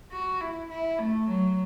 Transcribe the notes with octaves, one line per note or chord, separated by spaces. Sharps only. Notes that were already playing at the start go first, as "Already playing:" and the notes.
F#4
E4
E4
A3
F#3